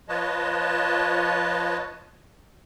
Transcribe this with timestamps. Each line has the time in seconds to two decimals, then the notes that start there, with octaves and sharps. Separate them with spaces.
0.09 F3 F4 B4 C#5 D#5 A5